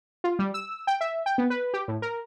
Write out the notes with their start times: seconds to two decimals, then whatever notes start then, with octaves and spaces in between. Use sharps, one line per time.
0.24 F4
0.39 G3
0.54 E6
0.87 G5
1.01 E5
1.26 G5
1.38 B3
1.50 B4
1.74 G4
1.88 A2
2.02 A#4